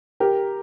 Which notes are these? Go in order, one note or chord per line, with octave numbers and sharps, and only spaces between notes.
G4 A#4